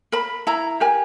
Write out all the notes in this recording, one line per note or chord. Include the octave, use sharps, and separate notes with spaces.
A#4 B5
E4 A#5
G4 A#4 G#5